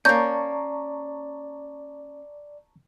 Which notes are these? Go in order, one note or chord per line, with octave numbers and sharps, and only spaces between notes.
A#3 C#4 D5 A5 A#5 C#6 G6